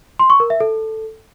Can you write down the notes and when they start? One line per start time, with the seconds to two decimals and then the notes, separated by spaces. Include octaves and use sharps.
0.19 C6
0.30 C#6
0.40 A#4
0.50 E5
0.60 A4